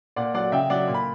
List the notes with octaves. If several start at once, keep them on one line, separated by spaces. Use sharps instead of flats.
A#2 D5 F#5
F#3 D5 F#5
C#3 E5 G5
F#3 D5 F#5
A#2
B5